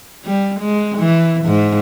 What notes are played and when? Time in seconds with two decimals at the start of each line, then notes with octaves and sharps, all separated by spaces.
0.25 G3
0.60 G#3
0.98 E3
1.45 G#2